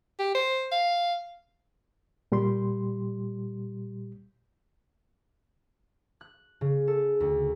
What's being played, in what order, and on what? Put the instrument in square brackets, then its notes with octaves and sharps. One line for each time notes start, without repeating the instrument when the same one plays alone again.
[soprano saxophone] G4
C5
F5
[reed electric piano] A#2 G3 G4 C6
[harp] F#6
C#3
A4
D2